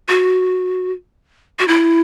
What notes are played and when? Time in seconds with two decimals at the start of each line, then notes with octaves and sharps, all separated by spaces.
0.08 F#4
1.59 F#4
1.68 E4